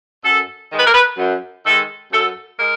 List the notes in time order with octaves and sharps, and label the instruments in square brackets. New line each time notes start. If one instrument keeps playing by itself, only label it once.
[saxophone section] F#2 A4
D#3 G#3
B4
A#4
B4
F#2
D#3 G#3 A4
F#2 A4
G#3 A#4